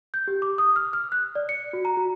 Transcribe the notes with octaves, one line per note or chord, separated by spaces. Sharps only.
G6
G4
D6
D#6
F6
F6
F#6
D5
C#7
F#4
A#5
F#4